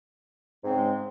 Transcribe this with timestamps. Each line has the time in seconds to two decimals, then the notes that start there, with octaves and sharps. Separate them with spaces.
0.62 G#2
0.65 C4
0.69 C#3
0.72 G#3